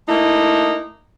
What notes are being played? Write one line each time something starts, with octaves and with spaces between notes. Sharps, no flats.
A3 A#3 D#4 E4